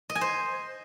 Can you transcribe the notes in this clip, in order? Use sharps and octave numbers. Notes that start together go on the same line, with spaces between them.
D#5
G#5
C5